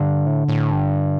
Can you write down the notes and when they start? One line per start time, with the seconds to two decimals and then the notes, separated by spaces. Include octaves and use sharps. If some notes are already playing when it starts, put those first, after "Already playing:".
Already playing: G2 D3
0.26 A2
0.48 A2
0.72 G2